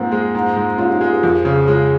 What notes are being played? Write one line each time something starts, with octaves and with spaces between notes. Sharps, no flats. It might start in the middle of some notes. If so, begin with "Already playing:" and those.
Already playing: G#2 F3 A#3 C4
G#3
G#2
G#2
G#2 C#4 F4
D#4 G4
G#3 F4 G#4
G4 A#4
F2 F4 G#4
C#3
G#3 C#4 F4